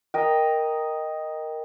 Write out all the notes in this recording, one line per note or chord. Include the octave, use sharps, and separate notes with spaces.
A#4 D#5 G5